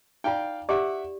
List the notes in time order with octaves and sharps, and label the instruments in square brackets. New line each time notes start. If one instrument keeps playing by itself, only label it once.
[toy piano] D#4 F4 [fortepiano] D5 F5 G5
[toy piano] G4 D5 [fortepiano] E5 F#5 D6